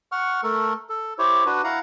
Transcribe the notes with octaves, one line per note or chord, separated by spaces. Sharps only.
F#5 C#6 F6
A3 A4 A#4
A4
E4 G4 C5 C#5
D4 F#4 B4
E4 F5 F#5 A#5